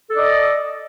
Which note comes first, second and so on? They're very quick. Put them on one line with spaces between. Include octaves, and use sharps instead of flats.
A4 D5 D#5